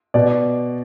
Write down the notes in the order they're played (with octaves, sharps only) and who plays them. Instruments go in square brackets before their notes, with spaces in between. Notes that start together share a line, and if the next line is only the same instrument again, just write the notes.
[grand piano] B2 D5